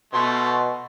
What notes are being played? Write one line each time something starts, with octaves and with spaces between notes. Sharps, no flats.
B2 A3 C6